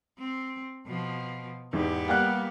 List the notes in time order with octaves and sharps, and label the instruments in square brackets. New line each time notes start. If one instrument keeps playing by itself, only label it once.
[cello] C4
B2 F3
[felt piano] E2 G#2 [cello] B3 G4
[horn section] G3 A#3 [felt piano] F#5 G5 F#6